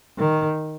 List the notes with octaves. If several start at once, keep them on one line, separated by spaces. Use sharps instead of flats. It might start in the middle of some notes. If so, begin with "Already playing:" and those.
D#3